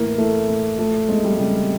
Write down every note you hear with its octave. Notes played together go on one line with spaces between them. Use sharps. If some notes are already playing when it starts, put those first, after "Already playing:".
Already playing: A2 E3 A#3
E3 A3
A2
F3 A3
E2 G#3
G3
G#3
C#3 G3